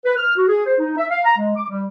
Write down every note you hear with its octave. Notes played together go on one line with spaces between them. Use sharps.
B4
F6
F#4
G#4
C5
D#4
E5
F5
A#5
G#3
D6
G3